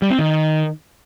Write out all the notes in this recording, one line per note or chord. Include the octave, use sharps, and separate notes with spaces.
G3
C4
D#3